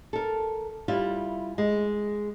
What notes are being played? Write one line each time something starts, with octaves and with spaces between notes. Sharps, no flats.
A4 A#4
G3 E4 F4
G#3